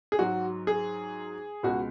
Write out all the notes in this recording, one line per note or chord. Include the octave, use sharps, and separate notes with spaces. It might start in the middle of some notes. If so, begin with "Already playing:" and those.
G#4
G#2 F#3 F#4
G#4
C#2 B2 G#3 F#4